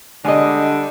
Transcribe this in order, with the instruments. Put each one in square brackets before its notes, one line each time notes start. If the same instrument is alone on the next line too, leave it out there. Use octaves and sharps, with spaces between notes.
[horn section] D3 G3 D4 [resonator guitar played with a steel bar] G#3 D#5